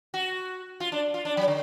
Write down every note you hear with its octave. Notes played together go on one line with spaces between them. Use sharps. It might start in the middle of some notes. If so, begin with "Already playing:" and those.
F#4
F4
D4
F4
D4
F#3
D3